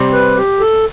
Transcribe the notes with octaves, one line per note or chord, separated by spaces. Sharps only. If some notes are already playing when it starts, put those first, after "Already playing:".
Already playing: C3 G3 C4
B4
G4
A4